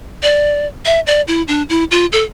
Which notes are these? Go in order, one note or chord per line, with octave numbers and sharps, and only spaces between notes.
D5
E5
D5
E4
D4
E4
F4
A4